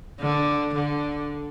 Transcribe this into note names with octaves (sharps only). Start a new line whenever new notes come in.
D3
D3